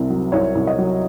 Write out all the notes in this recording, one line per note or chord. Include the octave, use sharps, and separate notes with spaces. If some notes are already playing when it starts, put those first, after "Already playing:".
Already playing: C2 C3
F#3
C2 C#5
C2
D#5
F#3